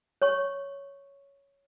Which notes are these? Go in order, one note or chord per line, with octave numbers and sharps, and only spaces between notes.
C#5 C#6